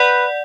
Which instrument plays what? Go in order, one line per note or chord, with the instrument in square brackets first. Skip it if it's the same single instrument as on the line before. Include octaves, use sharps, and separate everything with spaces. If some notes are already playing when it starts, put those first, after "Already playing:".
Already playing: [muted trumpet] B4 [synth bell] D5 F#5